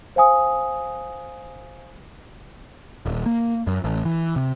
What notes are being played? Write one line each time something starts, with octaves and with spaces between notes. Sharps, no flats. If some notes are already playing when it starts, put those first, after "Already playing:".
C5 F5 G#5 D#6
D#1
A#3
F#2
A1
E3
C3